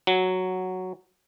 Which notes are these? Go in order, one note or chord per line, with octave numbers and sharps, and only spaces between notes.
F#3